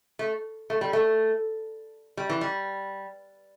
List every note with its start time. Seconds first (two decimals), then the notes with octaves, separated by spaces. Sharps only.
0.19 A3
0.70 A3
0.81 G3
0.93 A3
2.17 G3
2.30 E3
2.41 G3